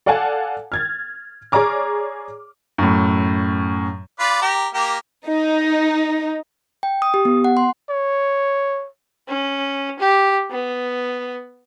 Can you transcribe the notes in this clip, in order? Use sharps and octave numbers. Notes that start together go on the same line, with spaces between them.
A4 D5 F5 F#5 G#5 A5
F6 G#6 A6
G#4 C#5 D5 A#5 D6 F6
F#2 A2
F4 B4 D5
G4 A#4
A#3 G4 A#4
D#4
G5
D#6
G4
B3
F#5
C6
C#5
C#4
G4
B3